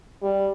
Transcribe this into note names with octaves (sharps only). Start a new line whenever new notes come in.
G3